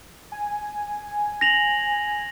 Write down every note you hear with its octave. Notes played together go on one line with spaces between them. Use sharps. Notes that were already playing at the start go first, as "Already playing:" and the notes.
G#5
A#6 F7 F#7